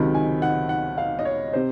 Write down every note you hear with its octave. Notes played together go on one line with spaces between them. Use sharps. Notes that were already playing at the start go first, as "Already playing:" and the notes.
Already playing: C#2 C3 D#3 F#3
G#5
F#5
F#5
F5
D#5
C#5
C3 C5